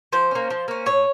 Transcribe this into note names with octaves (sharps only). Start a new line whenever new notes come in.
F3 C5
A#3 C#4
F3
A#3 C#4
A2 C#5